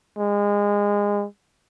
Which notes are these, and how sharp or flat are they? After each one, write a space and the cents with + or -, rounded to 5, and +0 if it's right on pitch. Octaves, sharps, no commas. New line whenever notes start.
G#3 -25